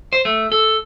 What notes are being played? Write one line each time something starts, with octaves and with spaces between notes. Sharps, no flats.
C5
A3
A4